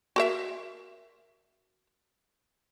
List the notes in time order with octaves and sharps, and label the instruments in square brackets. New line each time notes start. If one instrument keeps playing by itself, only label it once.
[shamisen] F#4 A#4 E5